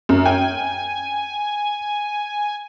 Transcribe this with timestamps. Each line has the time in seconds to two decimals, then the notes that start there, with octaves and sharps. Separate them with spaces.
0.09 F#2
0.25 G5 G#5